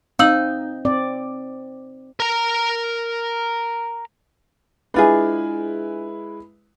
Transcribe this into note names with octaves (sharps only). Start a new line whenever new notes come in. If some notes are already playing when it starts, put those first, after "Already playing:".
C4 D#4 F5 E6 F#7
C4 D5
A#4 A#5
G#3 D4 E4 F4 G#4 B4